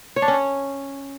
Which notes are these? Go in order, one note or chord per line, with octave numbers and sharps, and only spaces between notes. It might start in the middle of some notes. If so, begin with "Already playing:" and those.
C#5
D4
C#4
C#5